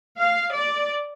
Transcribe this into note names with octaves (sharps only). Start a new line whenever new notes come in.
F5
D5